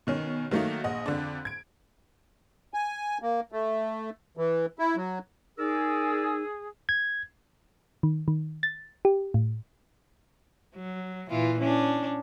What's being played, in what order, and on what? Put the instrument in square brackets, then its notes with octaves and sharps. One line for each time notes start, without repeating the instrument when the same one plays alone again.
[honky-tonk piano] B2 D#3 C#4
D#3 F#3 A3 A#3 D#4
A#1 D#5 F#5
F2 D3 D4
G#6 D7
[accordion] G#5
A#3
A3
E3
E4
F#3
[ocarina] D#4 [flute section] G#4 [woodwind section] A#4 D5 E6
[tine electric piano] G#6
[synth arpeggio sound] D#3
D#3
A6
G4
A2
[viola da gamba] F#3
A#2 E3 F4
C#4 D4